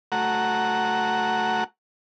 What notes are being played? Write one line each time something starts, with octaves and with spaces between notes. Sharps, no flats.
A3 F#4 F#5 A#5